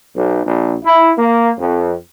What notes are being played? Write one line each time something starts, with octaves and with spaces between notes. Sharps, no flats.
B1
A#1
E4
A#3
F2